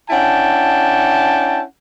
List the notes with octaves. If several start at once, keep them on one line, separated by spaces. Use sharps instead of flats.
C#4 D4 E4 F#5 G5 A5